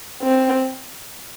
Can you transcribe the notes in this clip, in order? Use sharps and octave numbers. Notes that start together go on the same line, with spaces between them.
C4